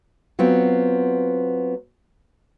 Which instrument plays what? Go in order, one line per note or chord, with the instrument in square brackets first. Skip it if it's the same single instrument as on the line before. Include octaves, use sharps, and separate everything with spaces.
[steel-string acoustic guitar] F#3 B3 C4 F4